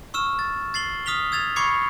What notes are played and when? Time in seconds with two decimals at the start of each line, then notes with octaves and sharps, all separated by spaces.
0.14 C#6 E6 F6 E7
0.39 A6
0.74 A6 C7 F#7 G7
1.06 D#6 F6 B6 F7 G7
1.32 E6 G#6 A6 F7
1.56 B5 C#6 D6 G#6 C7 C#7